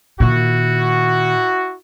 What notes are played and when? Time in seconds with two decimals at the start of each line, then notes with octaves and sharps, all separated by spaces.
0.20 A#2 D#3 E4 F#4